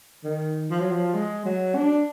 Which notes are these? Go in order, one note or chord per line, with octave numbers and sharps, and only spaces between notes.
D#3
F3
F#3
F3
G#3
F#3
D4